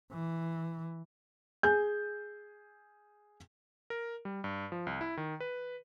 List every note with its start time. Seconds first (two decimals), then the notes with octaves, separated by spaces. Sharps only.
0.12 E3
1.63 G#4 G#5 G6
3.90 A#4
4.25 G3
4.44 G2
4.72 F3
4.87 C2
5.01 E4
5.17 D#3
5.40 B4